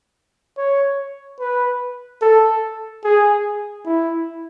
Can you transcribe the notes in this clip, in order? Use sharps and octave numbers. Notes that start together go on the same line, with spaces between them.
C#5
B4
A4
G#4
E4